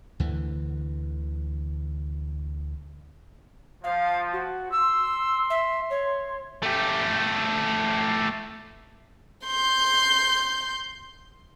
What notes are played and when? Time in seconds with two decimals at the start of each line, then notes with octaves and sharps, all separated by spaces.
0.20 D2 D3 E3
3.84 F3 F5
4.33 F#4
4.71 C6 E6
5.50 E5
5.90 C#5
6.63 A3 G4
9.46 C6 G6